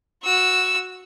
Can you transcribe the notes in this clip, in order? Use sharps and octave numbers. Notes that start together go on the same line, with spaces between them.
F#4 E6